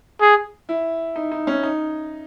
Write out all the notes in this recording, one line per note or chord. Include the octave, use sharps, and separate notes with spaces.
G#4
E4
D#4
D#4
C#4
D#4